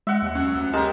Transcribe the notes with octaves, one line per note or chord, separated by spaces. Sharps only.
G#3 E5 F#5
D#2
C#4 F#4
D2
G#3 G4 A#4 C#5 A5